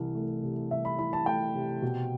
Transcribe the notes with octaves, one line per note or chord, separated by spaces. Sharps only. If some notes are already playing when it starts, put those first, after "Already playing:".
Already playing: C2 E3
A3
C3
C2 E5
B5
E3 B5
A5
A3 G5
C3
B2